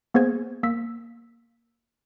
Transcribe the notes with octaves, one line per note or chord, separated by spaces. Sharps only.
A#3 B3 G#4 C5 G#6
A#3 E6 B6